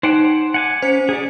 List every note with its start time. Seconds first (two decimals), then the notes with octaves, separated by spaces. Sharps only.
0.03 D#4 C5 F#5 G5
0.54 F#5 G#5 D6
0.82 C#4 C5 C#7
1.09 G#4 D5